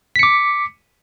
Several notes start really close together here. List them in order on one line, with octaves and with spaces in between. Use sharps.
B6 C#7 D6